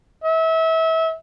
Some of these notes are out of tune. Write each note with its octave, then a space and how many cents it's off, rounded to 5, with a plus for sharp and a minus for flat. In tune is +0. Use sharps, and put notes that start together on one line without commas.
E5 -30